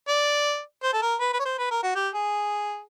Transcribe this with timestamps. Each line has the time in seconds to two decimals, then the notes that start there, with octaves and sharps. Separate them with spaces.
0.08 D5
0.83 C5
0.93 A4
1.02 A#4
1.20 B4
1.33 B4
1.40 C#5
1.45 C5
1.58 B4
1.71 A#4
1.83 F#4
1.96 G4
2.15 G#4